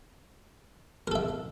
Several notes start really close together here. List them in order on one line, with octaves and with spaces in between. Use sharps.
A#4 A4 E5